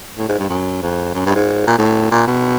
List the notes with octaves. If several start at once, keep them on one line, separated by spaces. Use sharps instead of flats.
A2
G#2
G2
F#2
F2
F#2
G2
G#2
A#2
A2
A#2
B2